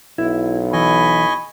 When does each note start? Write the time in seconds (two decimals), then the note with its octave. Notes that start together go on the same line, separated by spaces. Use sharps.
0.18 B1 E4
0.73 E3 D#5 G#5 B5 C#6